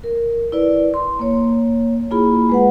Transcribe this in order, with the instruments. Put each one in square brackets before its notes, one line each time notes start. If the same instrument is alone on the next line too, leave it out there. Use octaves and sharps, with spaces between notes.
[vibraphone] A#4
E4 B4 D5
C6
A#3 C#5
A#3 E4 F4 G#4 B5
G#3 B4 F#5